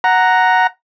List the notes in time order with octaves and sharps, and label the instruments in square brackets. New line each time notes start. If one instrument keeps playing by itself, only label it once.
[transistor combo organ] F#5 A#5